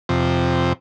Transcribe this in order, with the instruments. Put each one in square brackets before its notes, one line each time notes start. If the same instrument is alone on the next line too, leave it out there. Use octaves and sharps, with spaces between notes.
[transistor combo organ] F2 C3